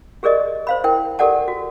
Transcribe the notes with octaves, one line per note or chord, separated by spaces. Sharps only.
G4 G#4 A#4 D5 D#5
C5 F5 B5
E4 A#4 G5
G4 A4 A#4 D5 F#5 A5
F#4